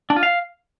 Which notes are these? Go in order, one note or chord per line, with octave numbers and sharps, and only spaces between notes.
D4
F4
F5